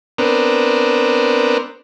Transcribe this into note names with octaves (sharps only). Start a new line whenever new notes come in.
B3 C4 D4 A#4